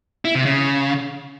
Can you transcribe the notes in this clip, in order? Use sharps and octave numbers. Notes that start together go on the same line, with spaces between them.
E4
C3
C#3